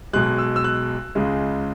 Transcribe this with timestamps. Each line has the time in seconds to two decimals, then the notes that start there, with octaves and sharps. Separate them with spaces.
0.13 B1 B2 G#3 F#6
0.38 E6
0.56 E6
0.64 F#6
1.15 C#2 C#3 G#3